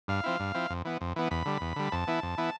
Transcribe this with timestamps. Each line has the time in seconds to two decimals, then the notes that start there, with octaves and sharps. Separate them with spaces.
0.08 G2 F5
0.24 F3 C4 E4
0.40 G2
0.54 F3 C4 E4
0.70 F2
0.85 E3 B3
1.01 F2
1.16 E3 B3
1.31 E2 B5
1.45 D3 G3
1.61 E2
1.76 D3 G3
1.92 F2 A5
2.07 E3 B3 E4
2.23 F2
2.38 E3 B3 E4